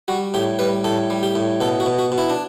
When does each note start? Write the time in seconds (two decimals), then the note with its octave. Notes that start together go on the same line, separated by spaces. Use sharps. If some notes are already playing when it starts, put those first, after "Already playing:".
0.08 G3 F#4
0.34 A2 G4
0.59 G3 B4
0.84 A2 A4
1.10 G3
1.23 G4
1.35 A2
1.61 B2 A4
1.80 F#4
1.86 B2
1.99 F#4
2.12 B2
2.18 E4
2.30 D4